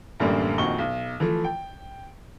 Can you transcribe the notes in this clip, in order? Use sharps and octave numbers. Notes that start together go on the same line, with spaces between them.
A1 F#2 D3 G3 A#3
A#1 F2 D#3 F#4 C#6 G7
B1
E3 F3 A3
G5